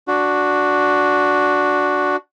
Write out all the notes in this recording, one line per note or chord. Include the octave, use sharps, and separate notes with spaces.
D4 F#4